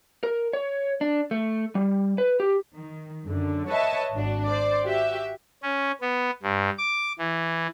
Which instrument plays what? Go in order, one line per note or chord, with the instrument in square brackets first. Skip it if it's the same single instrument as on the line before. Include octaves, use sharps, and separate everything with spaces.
[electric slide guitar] A#4
C#5
D4
A3
G3
B4
G4
[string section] D#3
F#2 D3
B4 C#5 D#5 E5 A5
G#1 D4 F#4
C5 D5
F#4 G4 E5
[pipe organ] C#4
B3
G2
D6
E3